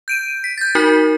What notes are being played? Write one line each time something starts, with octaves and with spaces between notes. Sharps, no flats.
G6 D7 D#7
B6
G6 A6
D#4 F#4 A#4 B6